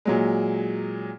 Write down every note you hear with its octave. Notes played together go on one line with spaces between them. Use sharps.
A#2 F#3 G#3